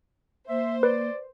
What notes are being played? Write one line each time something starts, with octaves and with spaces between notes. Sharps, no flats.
A#3 C5 E5
B4 D5